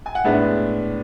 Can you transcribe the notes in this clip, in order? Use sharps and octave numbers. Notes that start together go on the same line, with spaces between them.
G#5
F#5
A2 G#3 B3 D4 E5